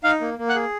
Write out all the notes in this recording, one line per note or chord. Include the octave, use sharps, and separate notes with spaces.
D#4 F5 F6
A#3
A#3
F#5 F#6
G#4